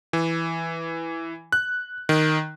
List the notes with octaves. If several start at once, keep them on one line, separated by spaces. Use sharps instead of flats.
E3
F#6
D#3